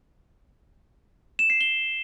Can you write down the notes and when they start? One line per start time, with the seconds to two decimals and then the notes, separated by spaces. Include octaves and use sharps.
1.39 E7
1.50 C7
1.61 G7